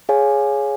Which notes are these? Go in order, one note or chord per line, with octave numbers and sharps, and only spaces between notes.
G#4 C#5 F5 G#5